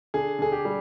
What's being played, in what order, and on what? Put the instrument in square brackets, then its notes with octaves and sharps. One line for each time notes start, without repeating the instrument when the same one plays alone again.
[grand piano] D3 G#4
D3 G#4
G4
G3